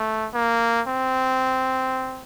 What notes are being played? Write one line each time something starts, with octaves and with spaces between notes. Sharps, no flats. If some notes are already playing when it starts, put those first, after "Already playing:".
Already playing: A3
A#3
C4